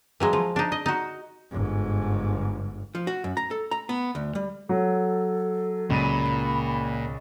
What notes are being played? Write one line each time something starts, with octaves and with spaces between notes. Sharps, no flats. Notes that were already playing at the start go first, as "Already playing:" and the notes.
E3 F#3 G#3
F3
D4 D#4
D#5
D#4 F#4
G1 G#2
F3
F#4
F#2
A#5
A4
A#5
B3
D2
G3
F#3 A4
C#2 A#2 B5 D#7